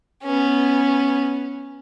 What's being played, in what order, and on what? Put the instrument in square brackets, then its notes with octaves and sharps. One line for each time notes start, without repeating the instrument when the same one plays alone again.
[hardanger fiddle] B3 C#4